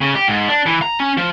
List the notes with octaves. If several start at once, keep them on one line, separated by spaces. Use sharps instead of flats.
C#3
G4
G#2
D4
E3
A#5
C#4
F3